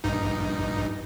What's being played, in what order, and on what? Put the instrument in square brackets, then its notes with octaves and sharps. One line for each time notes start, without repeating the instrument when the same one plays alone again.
[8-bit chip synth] A#1 G2 D#4